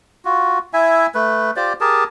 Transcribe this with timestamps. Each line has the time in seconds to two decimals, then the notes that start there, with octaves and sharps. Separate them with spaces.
0.25 F4 F#4
0.73 E4 E5 G#5
1.15 A3 B4
1.56 F4 G4 C5 D5
1.81 G4 G#4 A#4 A5